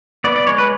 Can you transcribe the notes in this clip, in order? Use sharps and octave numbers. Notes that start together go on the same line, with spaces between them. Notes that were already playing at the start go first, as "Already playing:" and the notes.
B3 D5
D5
G#3 C#5
B4